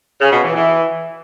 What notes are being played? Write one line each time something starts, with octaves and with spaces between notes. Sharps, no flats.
C#3
B2
E3
E3